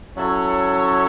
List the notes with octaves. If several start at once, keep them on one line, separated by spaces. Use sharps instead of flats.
F#3 C#4 E4 A4 C#5